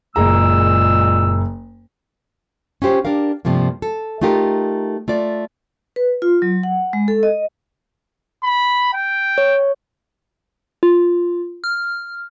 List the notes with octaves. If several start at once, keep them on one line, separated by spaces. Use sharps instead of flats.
F#1 A#2 G#3 G#4 A#5 E6
C#4 F4 G4 C5
D4 G4 A#4 F5
G2 C3 F3 A3 A#3
A4
A3 D#4 F4 G4 A#4
A3 F4 D5
B4
F4
F#3
F#5
G#3
A4
D#5
B5
G5
C#5
F4
F6